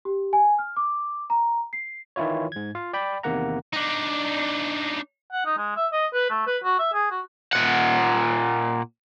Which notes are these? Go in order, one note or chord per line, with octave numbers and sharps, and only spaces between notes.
G4
G#5
F6
D6
A#5
C7
D#3 E3 E4 F4 C#5
G#2 G#6
F4 F5
D5 G5 B5
E2 C3 D#3 A#3 F#5 A#5
D4 D#4
F#5
D#4
G#3
E5
D#5
B4
A3
B4
F#4
E5
G#4
F#4
A#2 F#5